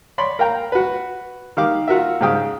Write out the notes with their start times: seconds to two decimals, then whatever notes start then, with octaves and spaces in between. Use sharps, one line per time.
0.18 C#5 D5 B5 C6
0.39 A#4 F5 G5 A#5
0.72 F#4 B4
1.57 D#3 G4 F5 D6
1.88 F4 F#4 A#4 E5
2.21 G#2 C#3 G4 F5 G5 D#6